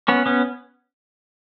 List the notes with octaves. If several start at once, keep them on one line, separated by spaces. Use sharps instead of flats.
B3 C#4
B3 C#4